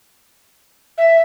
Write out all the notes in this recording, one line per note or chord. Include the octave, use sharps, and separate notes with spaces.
E5